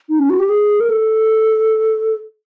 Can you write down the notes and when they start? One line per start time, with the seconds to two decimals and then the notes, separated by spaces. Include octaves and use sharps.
0.09 D#4
0.19 C#4
0.30 F#4
0.39 G4
0.49 G#4
0.80 A#4
0.90 A4